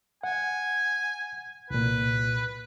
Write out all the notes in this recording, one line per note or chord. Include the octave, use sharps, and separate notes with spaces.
F#5 G#5
C2 A#2 B4